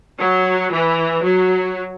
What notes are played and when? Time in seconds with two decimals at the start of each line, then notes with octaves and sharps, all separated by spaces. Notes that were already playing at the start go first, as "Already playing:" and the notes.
0.20 F#3
0.73 E3
1.25 F#3